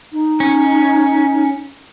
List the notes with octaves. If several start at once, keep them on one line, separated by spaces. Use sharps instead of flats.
D#4
C#4